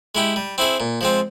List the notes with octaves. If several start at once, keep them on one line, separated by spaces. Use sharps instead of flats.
G#3 E4 G4
G3
C4 E4 G#4
A#2
F3 G#3 C4